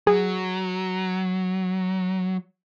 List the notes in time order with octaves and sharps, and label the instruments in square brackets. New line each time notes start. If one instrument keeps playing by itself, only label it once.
[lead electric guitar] F#3 [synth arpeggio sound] G#4